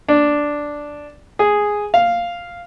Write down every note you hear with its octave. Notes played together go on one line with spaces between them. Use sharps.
D4
G#4
F5